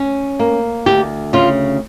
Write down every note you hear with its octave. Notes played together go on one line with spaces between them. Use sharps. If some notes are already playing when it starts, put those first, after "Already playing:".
Already playing: C#4
A#3
D2 G4
C#3 F4